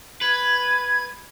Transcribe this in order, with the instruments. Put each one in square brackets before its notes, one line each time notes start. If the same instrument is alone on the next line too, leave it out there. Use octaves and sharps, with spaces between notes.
[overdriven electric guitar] B4 [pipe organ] G#6